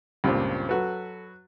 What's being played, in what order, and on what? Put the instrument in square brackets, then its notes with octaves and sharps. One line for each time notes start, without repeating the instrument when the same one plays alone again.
[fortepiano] C#2 [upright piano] G2 A#2 C4
[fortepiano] F#3 F#4 B4 [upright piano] A4